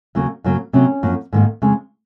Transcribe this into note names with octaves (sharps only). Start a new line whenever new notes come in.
D#2 C#3 F#3 A#3
F#2 C#3 F#3 A#3
C3 F#3 A#3 C#4
F#2 F3 A#3
G#2 D#3 A#3
F2 C#3 G#3